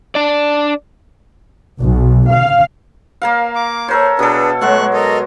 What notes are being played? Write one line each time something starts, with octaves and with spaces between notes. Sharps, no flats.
D4 D5
B1
F5
A#3 A#4 F5
D6
A4 A#4 C5 C#5
B2 D4 G#4 A4 B4
F#3 G#3 A3 F#4 C#6 F#6
A4 A#4 D#5